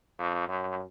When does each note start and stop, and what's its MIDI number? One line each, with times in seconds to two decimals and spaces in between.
0.18 0.44 41
0.48 0.83 42